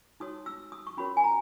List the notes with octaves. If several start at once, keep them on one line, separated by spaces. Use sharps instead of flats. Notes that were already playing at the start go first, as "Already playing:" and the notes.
D#4 F#4 C#5 D#6
E6
D#6
C#6
C#4 F#4 A#4 C#5 B5
G#5
A#5